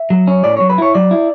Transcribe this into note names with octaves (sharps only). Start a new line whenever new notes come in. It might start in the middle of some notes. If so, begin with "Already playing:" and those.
Already playing: E5
F#3
C#4
A2 D5
F#3 C#5
B4
E4 C#5
F#3 D5
E4